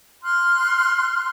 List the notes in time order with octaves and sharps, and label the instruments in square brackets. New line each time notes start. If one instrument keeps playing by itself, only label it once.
[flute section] C6 F6 F#6